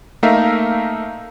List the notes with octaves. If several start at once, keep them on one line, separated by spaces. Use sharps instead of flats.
A3 A#3 D#4 A#4 E5 F5